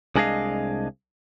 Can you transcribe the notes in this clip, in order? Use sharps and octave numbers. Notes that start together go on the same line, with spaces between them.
C2 G#3 D4 G#4 D#5 F5